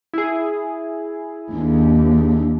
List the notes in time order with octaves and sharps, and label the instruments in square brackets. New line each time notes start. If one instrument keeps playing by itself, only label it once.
[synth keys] E4 G#4
[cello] D#2 [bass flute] D4